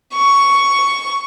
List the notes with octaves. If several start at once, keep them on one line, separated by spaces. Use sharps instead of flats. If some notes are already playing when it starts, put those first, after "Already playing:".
C#6